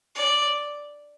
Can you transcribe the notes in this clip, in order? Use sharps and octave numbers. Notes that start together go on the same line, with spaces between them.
D5